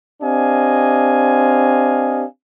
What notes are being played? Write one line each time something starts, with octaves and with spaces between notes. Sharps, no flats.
C4 D4 G4 D#5 F5 G#5